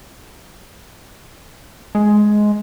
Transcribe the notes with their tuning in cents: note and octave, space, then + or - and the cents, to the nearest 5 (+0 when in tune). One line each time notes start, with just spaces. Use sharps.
G#3 +10